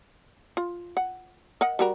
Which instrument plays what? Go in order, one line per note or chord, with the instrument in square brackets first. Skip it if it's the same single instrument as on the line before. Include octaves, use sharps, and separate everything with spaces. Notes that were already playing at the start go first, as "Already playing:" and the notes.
[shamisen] F4
F#5
A#4 D#5 F#5
G3 F#4 A#4